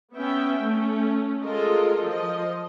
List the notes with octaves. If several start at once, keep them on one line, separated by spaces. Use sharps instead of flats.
B3 C#4 E5 G5
A3 C#4
G#3 F4 A4 A#4 D#5
F3 D#5